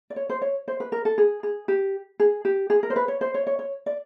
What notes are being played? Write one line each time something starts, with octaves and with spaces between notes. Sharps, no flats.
D5
C#5
C5
C#5
C5
B4
A#4
A4
G#4
G#4
G4
G#4
G4
G#4
A#4
C5
B4
C#5
C5
C#5
C#5
C#5
D5